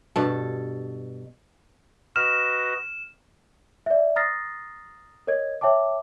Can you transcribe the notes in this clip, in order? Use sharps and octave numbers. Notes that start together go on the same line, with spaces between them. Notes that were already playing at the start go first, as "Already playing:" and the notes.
G2 B2 A4
F#4 B4 D#5 F6 E7
D5 E5
A#5 D#6 F6 A6 A#6 C7
A#4 C#5 D#5 G#6
C#5 E5 G5 A5 D6